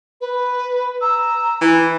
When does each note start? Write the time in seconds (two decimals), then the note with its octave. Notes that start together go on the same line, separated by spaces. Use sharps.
0.21 B4
1.01 A#5 E6
1.61 E3